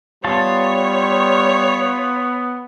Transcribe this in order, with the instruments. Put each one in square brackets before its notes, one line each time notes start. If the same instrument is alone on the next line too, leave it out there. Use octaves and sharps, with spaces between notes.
[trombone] G3 [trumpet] B3 [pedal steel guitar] F4 A5 [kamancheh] C#5